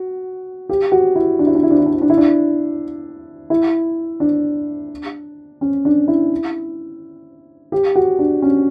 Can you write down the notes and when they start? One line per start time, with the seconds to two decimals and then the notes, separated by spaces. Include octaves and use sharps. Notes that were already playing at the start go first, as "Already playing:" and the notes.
Already playing: F#4
0.69 G4
0.92 F#4
1.16 E4
1.39 D4
1.47 E4
1.55 D4
1.63 E4
1.71 D4
1.78 E4
1.86 D4
1.94 E4
2.02 D4
2.10 E4
2.18 D4
3.50 E4
4.20 D4
5.61 C#4
5.85 D4
6.08 E4
7.72 G4
7.96 F#4
8.19 D4
8.42 C#4